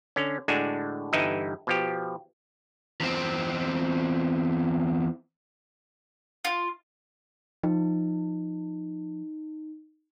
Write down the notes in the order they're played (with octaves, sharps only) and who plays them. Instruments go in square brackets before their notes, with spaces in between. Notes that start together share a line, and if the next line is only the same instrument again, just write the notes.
[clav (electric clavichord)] D3 C#4
A2 D3 G#3 D4 F#4 G#5
G1 G2 E3 D#4 E4 D#5
B2 F3 G4
[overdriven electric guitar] E2 C4
[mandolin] F4
[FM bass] F3 [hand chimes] D#4